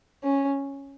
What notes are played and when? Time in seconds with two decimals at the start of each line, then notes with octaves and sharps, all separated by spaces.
0.24 C#4